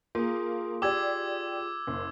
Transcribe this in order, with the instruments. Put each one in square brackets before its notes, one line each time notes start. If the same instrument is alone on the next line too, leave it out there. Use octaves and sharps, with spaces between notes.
[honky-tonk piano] A#3 [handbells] F4 G#4
[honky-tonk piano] G4 D5 [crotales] D6 E6 G#6
[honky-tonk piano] F#1